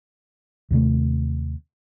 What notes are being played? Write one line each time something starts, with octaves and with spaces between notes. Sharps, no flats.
D#2 C3 A3